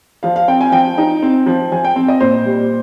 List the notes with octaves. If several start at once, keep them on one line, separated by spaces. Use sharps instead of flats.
F3 F5
F5
C4 G5
G#5
F3 G5
D#4
C4
F3
F3 G#5
G5
C4
D#5
A#2 C5
G3